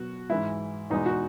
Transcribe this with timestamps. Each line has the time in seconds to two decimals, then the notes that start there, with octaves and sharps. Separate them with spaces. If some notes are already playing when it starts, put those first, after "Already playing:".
Already playing: B2 F#3 F#4
0.30 G#2 E3 G#3 E4
0.90 E2 B2 G#3 D#4
1.06 F#4